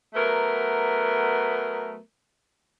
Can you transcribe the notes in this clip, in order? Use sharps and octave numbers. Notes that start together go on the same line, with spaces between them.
F#3 A3 B3 A#4